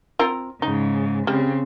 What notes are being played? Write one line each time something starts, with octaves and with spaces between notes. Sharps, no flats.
C4 F4 A#4
G#2 C#3 D#4
C#3 G3 C4